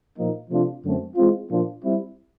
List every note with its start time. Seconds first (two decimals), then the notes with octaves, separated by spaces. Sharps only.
0.18 A#2 F3 A#3 D#4
0.50 C3 F3 A3 D4 F4
0.84 F#2 D3 F#3 A3 C4
1.16 E3 G#3 C4 F4
1.50 A#2 F3 A#3 D4 F4
1.83 G3 C4 E4